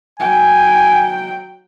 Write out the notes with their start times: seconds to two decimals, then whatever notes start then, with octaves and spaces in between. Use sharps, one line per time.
0.20 F#3 G5 G#5